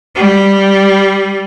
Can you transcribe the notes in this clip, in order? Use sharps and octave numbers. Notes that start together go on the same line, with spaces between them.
G3